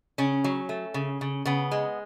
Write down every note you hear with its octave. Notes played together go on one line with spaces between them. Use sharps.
C#3 C#4
F#3
A3
C#3
C#3
C#3 B3
G#3